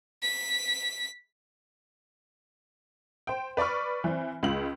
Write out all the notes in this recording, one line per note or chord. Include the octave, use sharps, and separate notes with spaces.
B6
C5 G5
B4 D5 B5 C#6 F6
E3 C4
C#2 G#3 F4 F#7